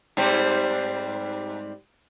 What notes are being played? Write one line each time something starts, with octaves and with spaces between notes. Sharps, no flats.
G#2 G3 C4